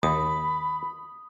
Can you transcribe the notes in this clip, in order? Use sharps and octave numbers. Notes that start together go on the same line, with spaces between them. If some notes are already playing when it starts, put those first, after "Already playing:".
D#2 B5 D#6